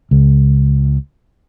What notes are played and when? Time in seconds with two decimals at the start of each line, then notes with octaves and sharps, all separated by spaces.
0.11 C#2